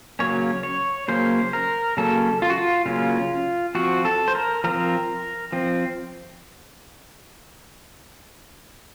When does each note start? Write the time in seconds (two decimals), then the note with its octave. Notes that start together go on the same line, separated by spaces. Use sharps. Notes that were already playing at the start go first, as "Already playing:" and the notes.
0.19 C#3 F#3 A#3 C#4 C#5
0.63 C#5
1.08 C#3 F#3 A#3 C#4 C5
1.53 A#4
1.97 C#3 F#3 A#3 C#4 A4
2.42 F4
2.50 F#4
2.58 F4
2.86 C#3 F#3 A#3 C#4 F4
3.75 F3 C4 F#4
4.05 A4
4.28 C5
4.35 A#4
4.64 F3 C4 A#4
5.52 F3 C4